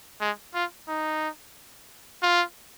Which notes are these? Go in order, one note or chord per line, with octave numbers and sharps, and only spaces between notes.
G#3
F4
D#4
F4